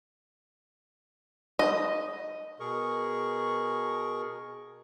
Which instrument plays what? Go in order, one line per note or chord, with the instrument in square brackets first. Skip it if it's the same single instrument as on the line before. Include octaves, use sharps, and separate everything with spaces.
[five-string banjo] D#5
[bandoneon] B2 G#4 A#4 C#6